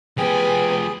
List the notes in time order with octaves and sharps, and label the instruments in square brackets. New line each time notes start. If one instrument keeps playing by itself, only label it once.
[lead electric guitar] F3 G4 [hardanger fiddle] B3 G#5 [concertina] G#4 [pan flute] G5